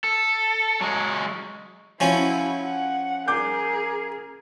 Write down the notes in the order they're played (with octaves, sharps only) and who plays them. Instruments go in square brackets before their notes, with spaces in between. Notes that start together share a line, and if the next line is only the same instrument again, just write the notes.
[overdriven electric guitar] A4
F#3 G#3
[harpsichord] F3 C#4 [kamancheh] E4 F#4
[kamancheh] F#5
[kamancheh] G#4 A#4 [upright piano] D6 G6